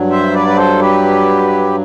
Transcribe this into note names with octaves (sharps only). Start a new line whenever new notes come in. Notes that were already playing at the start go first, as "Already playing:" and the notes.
Already playing: G2 F#3
C5 E5
B4 D5
B4
A4 C5
G4 B4